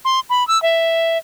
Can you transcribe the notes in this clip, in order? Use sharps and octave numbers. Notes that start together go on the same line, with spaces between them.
C6
B5
E6
E5